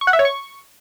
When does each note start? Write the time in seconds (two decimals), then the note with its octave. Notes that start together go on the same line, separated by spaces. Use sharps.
0.01 C#6
0.07 F#5
0.13 E5
0.19 C#5
0.25 C#6